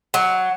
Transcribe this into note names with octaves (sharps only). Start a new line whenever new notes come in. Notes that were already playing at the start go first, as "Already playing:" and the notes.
F#3